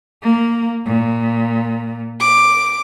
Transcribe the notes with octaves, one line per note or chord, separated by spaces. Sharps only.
A#3
A#2
D6